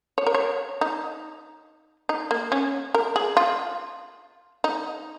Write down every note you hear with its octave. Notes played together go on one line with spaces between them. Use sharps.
C#5
A#4
C#5
D#4
D#4
A#3
C#4
A#4
G#4
F4
D#4